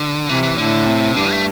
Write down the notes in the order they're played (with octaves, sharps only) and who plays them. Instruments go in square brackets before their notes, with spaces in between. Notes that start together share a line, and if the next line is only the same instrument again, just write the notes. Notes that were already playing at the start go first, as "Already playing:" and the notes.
Already playing: [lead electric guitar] D3
[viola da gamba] C3 [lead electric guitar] E3
[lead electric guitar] E3
[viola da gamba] A2 [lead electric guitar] D3
[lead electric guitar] C3
[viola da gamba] G2 [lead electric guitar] D3
[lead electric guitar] A3